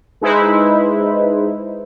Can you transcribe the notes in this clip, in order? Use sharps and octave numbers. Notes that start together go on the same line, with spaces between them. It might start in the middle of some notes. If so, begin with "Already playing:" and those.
G#3 D#4 E4 B4 C5